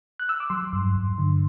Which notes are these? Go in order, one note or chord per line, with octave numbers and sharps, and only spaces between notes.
F#6
E6
D6
F#3 C6
G2
G2
D3